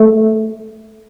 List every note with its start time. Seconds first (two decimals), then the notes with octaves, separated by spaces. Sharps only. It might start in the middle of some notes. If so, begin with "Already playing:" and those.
Already playing: A3